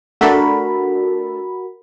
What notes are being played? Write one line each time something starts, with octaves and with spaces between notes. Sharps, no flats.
A3 D4 F#4 A4 A#4 B5